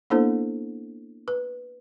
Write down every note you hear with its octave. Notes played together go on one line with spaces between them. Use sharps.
A#3 B3 D4 E4 A4 C5
B4